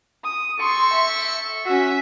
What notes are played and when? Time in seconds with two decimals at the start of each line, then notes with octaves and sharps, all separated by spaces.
0.23 D#6
0.60 C4 A4 C6 C#6
0.93 E5
1.65 C#4 F#4 E5